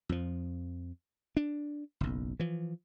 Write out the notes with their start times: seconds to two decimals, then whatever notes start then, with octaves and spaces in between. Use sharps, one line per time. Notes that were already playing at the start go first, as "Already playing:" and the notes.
0.09 F2 F3
1.37 D4
2.01 F#1 B1
2.40 E3 F3